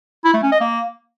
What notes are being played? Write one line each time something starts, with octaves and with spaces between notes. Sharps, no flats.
E4
A3
C#4
D#5
A#3